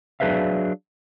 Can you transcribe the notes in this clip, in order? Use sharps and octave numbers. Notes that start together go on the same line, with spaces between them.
F#3 D4 G#4 B4 E5 F5